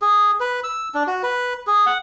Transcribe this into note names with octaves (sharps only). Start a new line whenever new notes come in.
G#4
B4
E6
D4
F#4
B4
G#4
F#5